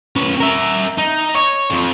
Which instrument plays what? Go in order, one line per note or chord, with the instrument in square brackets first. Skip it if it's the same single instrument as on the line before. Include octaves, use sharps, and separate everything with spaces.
[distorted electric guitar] C#4 B4
A#4 E5
D#4
C#5
F2 F3